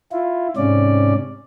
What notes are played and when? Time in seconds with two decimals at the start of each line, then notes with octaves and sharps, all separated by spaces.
0.12 E4 F4
0.57 G#2 C3 C#4 D5